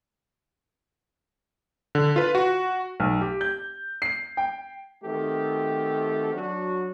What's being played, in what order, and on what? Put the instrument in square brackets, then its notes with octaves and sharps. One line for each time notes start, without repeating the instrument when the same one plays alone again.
[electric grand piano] D3
F4 B4
F#4
[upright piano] B1
G4
G6
C7
G5
[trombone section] D#3 A3 C4 F#4 G4 A4
F#3 D4 F#4